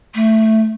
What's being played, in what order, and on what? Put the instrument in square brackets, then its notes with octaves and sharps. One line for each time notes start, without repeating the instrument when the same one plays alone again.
[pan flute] A3